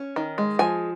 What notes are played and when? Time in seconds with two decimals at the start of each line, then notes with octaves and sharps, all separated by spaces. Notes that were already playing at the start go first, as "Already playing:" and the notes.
Already playing: C#4
0.16 D#3
0.38 G#3
0.59 F3 G#5